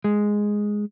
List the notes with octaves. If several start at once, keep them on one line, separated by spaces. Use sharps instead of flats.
G#3